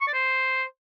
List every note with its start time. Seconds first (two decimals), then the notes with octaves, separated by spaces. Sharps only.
0.01 C#6
0.07 D5
0.14 C5